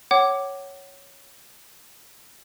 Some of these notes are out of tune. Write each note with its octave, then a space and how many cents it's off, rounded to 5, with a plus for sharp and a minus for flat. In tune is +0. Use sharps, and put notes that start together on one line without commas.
C#5 +0 F#5 +35 D6 +0